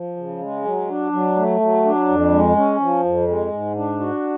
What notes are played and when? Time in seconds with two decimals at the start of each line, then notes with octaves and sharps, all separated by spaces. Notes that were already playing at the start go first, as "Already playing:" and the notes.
Already playing: F3
0.17 C#3
0.41 G#3
0.64 F#3
0.89 D4
1.12 F#3
1.36 A3
1.60 F#3
1.85 D4
2.08 F2
2.32 G#3
2.56 C#4
2.80 F3
3.05 F2
3.28 G#3
3.52 G#2
3.76 D4
4.00 F#4